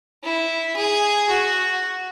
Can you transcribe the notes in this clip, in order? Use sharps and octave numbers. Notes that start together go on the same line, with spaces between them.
E4
G#4
F#4